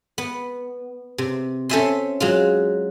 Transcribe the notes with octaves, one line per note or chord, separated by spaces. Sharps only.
B3
C3
C#4 A4 C5 E5 G#5 C6
F#3 G#3 F4